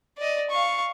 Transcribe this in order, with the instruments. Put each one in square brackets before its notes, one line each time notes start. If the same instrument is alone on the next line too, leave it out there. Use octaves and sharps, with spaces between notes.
[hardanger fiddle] D5 D#5
F5 C#6